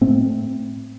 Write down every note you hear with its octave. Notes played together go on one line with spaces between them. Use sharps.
A2 A3 C4